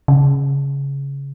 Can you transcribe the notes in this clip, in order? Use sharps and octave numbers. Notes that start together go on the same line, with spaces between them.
C#3